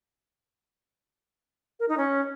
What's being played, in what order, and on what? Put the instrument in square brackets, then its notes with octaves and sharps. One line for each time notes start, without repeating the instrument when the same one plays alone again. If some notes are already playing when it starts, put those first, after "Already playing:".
[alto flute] A#4
D#4
C#4